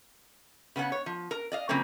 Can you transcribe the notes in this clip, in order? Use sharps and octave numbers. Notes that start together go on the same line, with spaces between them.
C#3 B3 C#4 F#5
C#5
F3
A#4
D5 D#5 F5
C#3 F3 F#3 A#3 C4